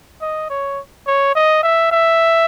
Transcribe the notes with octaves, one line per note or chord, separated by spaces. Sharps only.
D#5
C#5
C#5
D#5
E5
E5